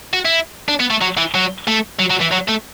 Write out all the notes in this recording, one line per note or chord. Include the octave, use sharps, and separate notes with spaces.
F#4
E4
D4
B3
A3
F#3
E3
F#3
A3
F#3
F#3
E3
F#3
A3